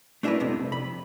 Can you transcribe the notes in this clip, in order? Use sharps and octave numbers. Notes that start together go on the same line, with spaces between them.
A3 D4 E4 G4 A#4 B4
C2 F2 C3
B5